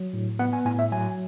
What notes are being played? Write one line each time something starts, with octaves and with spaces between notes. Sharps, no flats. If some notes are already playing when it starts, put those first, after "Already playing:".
Already playing: F#3
A2
B3 F#5
G#5
A2 G#5
E5
F#3 G#5